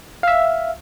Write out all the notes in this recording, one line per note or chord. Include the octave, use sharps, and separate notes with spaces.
E5 F5